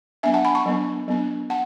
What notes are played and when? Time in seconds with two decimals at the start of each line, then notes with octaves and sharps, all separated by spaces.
0.23 F#3 B3 D4 E5 G#5
0.34 F#5 A5
0.45 G#5 B5
0.55 A5 C#6
0.66 F#3 B3 D4
1.08 F#3 B3 D4
1.50 F#5 A5